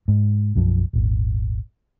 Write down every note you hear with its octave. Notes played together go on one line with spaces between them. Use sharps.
G#2
B1 F#2 F3
D#1 G#1